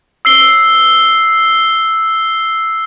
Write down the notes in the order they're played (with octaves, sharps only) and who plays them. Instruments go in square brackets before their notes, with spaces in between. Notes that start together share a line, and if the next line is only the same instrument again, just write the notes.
[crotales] E6 C7 G7